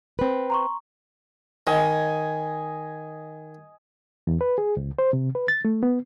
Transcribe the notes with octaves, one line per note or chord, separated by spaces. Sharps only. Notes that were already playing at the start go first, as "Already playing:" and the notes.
C4 B4
A#5 C6 C#6
D#3 D#5 G#5
E2
B4
G#4
C#2
C5
C3
B4
A6
A3
B3